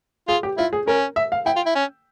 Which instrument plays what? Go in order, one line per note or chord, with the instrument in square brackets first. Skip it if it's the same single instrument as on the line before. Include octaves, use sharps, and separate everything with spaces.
[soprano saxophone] F4 [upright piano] G#4
[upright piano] G4
[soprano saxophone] E4 [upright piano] F4
[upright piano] G#4
[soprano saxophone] C#4 [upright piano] A#4
[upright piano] E5
F5
[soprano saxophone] E4 [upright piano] G5
[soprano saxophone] F4
E4
C#4